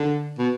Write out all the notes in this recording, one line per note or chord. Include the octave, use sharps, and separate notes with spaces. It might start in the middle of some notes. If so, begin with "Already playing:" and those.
Already playing: D3
B2